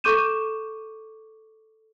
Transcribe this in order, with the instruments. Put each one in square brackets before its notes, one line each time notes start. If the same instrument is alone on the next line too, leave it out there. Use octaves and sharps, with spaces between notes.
[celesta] A4 C#6 D6 G6 D#7 E7